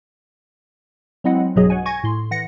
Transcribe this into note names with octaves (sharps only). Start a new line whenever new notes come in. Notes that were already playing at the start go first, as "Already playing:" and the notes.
F#3 G#3 C4 E4 D#5 F#5
B1 G2 B2 F#3 G#4 D#5
C#5 F#5 G#5
G#5 C#6 G#6 A#6
A2 C6
E3 F#5 A#6 C#7